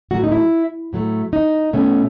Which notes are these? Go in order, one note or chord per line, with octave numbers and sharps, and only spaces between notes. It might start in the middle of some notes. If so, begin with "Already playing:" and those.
A2 F#3 A3 F#4
D#4
E4
A2 F#3 A3
D#4
B2 A3 C#4